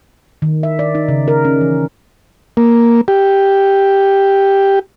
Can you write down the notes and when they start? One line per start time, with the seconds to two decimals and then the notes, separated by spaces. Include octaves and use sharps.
0.42 D#3
0.63 E5
0.79 D5
0.95 D#4
1.08 C#3
1.28 A#4
1.45 C#4
1.61 E3
2.57 A#3
3.08 G4